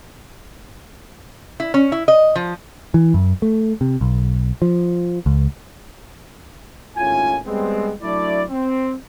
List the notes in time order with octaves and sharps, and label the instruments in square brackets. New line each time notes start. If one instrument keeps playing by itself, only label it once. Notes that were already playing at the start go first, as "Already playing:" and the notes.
[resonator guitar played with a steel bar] E4
C#4
E4
D#5
F3
[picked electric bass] E3
F#2
A3
C3
B1
F3
C#2
[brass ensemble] G#1 D#2 A2 C#4 F4 G#5
G3 G#3 B3 C4
F#3 A3 D4 E4 D5
C4